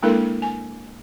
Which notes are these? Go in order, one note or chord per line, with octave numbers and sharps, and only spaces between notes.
G#3 A#3 D4 E4 A4 A#4
G#5